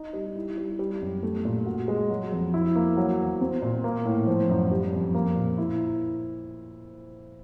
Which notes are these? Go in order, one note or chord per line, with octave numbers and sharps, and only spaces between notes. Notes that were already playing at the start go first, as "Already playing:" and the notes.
Already playing: D#4
G3
E4
G3
G3
F#2
A3
A#2
F#4
G#3
F#3
F2
E4
A#3
F#3
E2
C4
A#2
A#3
A2
F3
F#2
G3
F2
A#3
A#2
E4